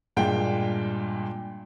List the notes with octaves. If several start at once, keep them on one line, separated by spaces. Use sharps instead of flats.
G2 A#2 G#3 G5